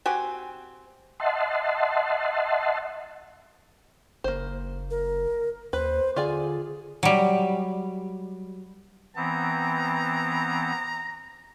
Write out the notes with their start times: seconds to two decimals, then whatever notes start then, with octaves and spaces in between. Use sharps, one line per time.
0.06 C4 F#4 G4 G#5
1.20 D#5 E5 F#5 A5 C6
4.24 F#1 A#3 C5
4.90 A#4
5.73 D#2 B4 C5
6.16 D3 F4 G#4 D5 G#5
7.03 F#3 G3
9.16 E3 B3 C4 A#5